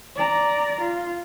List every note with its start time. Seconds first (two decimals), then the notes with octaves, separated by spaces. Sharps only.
0.16 D5 A#5
0.81 F4